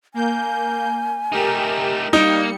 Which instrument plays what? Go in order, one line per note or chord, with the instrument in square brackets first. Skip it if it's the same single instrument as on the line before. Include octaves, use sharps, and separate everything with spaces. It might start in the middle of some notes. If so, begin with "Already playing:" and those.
[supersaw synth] A#3 G6 [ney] G#5
[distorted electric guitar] A3 D#4 [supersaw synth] G4 A#4 E7
[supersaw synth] G3 C#7 [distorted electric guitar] A#3 [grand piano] D#4